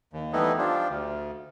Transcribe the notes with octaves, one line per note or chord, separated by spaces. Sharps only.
D#2
E3 G3 A3 B3 D#4 E4
F3 D4 F4 G4
D2